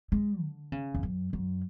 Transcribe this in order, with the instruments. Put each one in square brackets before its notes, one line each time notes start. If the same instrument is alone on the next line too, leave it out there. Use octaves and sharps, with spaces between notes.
[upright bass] G#3
D3
C#3
E2
F#2
F#2